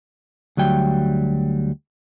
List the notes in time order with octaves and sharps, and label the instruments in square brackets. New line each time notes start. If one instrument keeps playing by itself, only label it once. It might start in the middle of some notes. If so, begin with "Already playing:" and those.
[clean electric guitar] D2 F#3 G3 G5